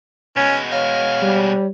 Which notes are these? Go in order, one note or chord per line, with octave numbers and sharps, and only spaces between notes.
B2 G#3 C#4
C#5 F5
G3